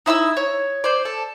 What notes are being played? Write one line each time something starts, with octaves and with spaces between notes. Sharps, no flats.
D#4 E4 B5 E6
C#5
C5 D5
A4